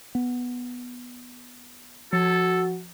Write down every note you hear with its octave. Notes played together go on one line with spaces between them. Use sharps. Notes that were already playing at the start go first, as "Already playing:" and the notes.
B3
F3 F#4 A4